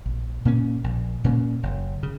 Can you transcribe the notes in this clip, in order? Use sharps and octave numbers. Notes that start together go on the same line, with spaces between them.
A#1
A#2 A#3 C#4
A#1
A#2 A#3 C#4
F#1
C#3